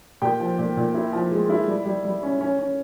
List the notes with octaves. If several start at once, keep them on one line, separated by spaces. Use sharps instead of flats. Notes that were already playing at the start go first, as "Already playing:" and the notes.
A#2 G4 G5
F3
A#2
A#2
E4
F3
G#3
E4
G3
G3
G3
C#4
C#4
C#4